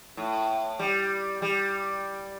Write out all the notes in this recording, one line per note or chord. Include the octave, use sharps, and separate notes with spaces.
A2
G3
G3